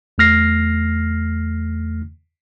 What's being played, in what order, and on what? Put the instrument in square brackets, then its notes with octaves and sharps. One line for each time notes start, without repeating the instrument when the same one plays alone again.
[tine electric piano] E2 A3 F6 A#6 C7